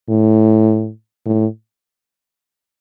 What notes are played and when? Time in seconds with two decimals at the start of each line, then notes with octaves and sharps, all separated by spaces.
0.09 A2
1.26 A2